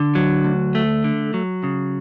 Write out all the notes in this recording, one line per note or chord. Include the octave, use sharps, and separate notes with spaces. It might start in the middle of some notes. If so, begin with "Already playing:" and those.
Already playing: D3
F#3
D2
A3
D3
F#3
C#3